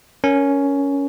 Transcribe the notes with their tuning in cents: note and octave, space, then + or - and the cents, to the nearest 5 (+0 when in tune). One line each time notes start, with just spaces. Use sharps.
C#4 +10 A#4 +5